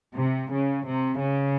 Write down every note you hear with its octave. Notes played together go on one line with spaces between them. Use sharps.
C3
C#3
C3
C#3